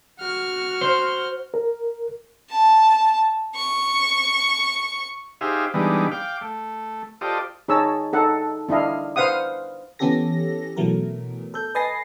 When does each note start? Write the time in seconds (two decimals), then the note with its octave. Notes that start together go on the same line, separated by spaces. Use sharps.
0.19 F#4 F6
0.81 C5
1.54 A#4
2.51 A5
3.56 C#6
5.41 D#4 G4 G#4 C5 E5 F5
5.74 E3 G3 G#3 B3 D4 D#4
6.11 F5 G5 D6
6.41 A3
7.21 F4 G4 A4 C5 D5 D#5
7.68 D#4 G#4 C#5 A5 E6
8.13 D#4 A4 F#5
8.69 D4 E4 D#5 F5
9.16 B4 C5 F5 F#5 D#6
9.99 E3 B3 C#4 G4 A4 A#6
10.76 B2 E3 F#3 A3 B3 A#4
11.54 A4 G6
11.75 B4 D#5 G#5 A6 A#6 C7